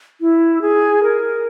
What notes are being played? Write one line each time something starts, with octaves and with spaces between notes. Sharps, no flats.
E4
G#4
A#4